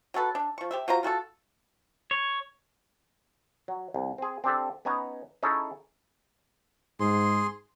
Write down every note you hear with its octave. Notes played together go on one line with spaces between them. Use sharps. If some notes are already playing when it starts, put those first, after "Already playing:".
F#3 F#4 A4 B4
D4
F3 C#6
G4 C5 E5
F#3 F4 C5 A#5
F4 F#4 G#4 A4
C#5
F#3
C2
C4 G#4
C4 D4 G4 A4
B3 C#4 D#4 G#5 A#5
C#4 D#4 E4 G#4 A4 C#5
G#2 G#4 C6